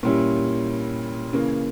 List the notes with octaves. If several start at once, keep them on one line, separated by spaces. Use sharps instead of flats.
A#2 G3 C#4 E4
C#3 E3 A#3